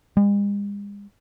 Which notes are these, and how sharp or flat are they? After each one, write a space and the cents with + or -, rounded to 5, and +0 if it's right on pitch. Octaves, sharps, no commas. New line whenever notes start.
G#3 -45